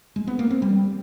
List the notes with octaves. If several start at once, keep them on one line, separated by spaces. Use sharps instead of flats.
G#3
B3
A#3
C4
G3